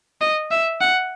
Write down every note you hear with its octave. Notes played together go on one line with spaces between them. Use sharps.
D#5
E5
F#5